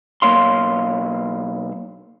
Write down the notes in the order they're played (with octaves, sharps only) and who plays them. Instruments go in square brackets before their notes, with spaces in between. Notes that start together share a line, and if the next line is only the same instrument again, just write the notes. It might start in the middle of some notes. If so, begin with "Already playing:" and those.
[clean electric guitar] B1 C3 A#3 C#5 F5 C6